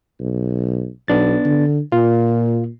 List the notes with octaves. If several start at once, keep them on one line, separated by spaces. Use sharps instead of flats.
B1
B1 B3 D4 A6
D3
A#2 F4